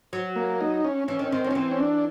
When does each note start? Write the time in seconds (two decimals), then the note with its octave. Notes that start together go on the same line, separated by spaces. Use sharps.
0.13 F#3
0.36 A#3
0.61 D#4
0.85 C#4
1.08 E3 C#4
1.19 D#3
1.25 C#4
1.32 D#3 C4
1.44 D#3
1.47 F3 C#4
1.55 E3 C4
1.71 C#4
1.80 D4